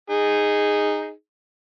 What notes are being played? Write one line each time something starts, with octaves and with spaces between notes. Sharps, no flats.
D#4 G#4